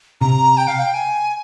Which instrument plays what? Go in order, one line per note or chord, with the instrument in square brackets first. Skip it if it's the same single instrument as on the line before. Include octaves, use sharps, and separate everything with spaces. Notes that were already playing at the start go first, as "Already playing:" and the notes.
[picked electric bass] C3 [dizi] A#5
[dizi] G5
F5
G5
G#5